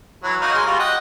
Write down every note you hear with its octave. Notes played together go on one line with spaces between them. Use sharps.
E3 F#3
A#3 D#4 F#4
G#3 C6
G3 F4 F#4
D#5 F#5 G5